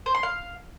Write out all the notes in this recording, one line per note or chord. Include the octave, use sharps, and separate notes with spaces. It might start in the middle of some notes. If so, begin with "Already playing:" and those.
C5
C6
F5